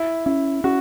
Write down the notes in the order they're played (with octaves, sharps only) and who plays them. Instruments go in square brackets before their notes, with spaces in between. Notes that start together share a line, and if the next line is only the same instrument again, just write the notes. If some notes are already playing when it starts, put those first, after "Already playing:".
Already playing: [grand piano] E4
[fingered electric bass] C#4 [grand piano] E4
[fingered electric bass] C#4 [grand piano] F#4